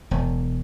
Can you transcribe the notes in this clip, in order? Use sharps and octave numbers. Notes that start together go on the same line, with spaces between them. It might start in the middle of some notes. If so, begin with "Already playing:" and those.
E1